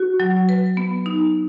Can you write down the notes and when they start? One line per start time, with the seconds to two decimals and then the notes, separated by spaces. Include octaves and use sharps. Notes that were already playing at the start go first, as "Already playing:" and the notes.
Already playing: F#4
0.20 F#3
0.49 B4
0.77 B3
1.06 D#4